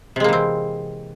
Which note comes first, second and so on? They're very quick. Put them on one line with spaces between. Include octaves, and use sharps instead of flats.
C3 G#3 A#3 E3 C4